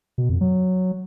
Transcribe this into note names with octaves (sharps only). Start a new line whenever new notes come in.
B2
F2
F#3